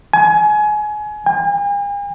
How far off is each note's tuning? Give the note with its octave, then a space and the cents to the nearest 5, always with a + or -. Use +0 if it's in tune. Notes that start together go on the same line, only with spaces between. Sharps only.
G#5 +25
G#5 -45